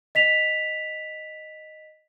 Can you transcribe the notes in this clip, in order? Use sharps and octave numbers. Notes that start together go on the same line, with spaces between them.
D#5 B6 F7